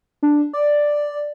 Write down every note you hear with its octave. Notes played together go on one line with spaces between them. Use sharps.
D4
D5